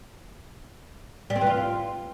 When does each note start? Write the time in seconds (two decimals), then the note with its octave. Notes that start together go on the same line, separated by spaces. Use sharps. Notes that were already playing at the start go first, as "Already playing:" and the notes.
1.30 G3
1.36 C4
1.41 E3
1.47 F4